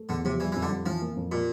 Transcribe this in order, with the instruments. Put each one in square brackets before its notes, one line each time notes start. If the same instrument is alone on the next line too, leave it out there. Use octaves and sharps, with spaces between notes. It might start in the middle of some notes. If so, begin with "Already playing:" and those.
Already playing: [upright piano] A3
[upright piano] E2 [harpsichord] D3
[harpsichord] C3 [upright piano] F3
[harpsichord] E3 [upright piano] G3
[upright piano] F2 [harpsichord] E3
[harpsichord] D3
[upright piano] F2
[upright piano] E3 [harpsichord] F3
[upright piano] A#3
F2
[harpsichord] A#2 [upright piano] G4